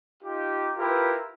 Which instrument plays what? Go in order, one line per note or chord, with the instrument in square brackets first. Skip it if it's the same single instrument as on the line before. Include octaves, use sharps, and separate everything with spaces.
[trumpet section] D#4 F4 G4
E4 F4 G4 A#4 B4